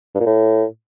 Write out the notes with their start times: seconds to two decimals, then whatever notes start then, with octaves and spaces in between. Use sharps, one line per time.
0.14 G2
0.20 A#2
0.26 A2